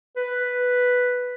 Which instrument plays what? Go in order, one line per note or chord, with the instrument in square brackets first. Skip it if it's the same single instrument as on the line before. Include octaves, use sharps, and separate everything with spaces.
[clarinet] B4